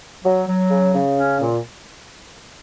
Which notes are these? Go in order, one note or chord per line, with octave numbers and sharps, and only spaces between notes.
F#3
F#3
C#3
C#3
C#4
A#2